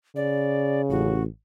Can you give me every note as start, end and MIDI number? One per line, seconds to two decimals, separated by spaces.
0.16 1.22 49
0.16 0.82 74
0.90 1.25 33
0.90 1.23 66